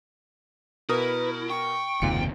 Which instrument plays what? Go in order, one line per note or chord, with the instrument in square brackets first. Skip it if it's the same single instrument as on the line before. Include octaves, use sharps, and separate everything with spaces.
[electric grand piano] B2 A#4 D#6 [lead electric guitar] E4 [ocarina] B4
[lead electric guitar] G5 [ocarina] C#6
[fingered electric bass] F#1 D#2 C3 [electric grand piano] G#2 F4 C#7